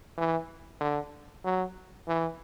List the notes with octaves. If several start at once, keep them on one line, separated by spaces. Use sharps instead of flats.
E3
D3
F#3
E3